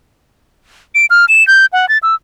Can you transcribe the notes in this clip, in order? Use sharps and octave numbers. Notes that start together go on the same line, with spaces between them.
D7
F6
E7
G6
F#5
A6
E6